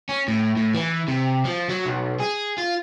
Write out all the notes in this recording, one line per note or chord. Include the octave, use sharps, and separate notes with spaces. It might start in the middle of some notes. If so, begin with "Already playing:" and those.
C#4
A2
A2
E3
C3
F3
F#3
B1
G#4
F4